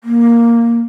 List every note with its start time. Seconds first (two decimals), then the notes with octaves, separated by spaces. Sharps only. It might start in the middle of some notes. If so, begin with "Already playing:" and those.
0.04 A#3